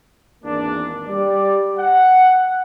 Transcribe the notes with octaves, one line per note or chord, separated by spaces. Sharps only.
G#1 E2 A#3 D4
G3 D5
F#5